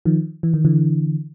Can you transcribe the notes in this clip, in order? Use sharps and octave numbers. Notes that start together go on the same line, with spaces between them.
D#3 F3
E3
D#3
D3 E3